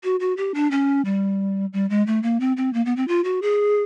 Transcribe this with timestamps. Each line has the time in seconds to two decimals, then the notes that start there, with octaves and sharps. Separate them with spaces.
0.04 F#4
0.20 F#4
0.37 G4
0.54 D4
0.71 C#4
1.05 G3
1.73 G3
1.90 G#3
2.07 A3
2.23 A#3
2.40 C4
2.57 C4
2.74 A#3
2.85 B3
2.96 C4
3.08 F4
3.24 F#4
3.42 G#4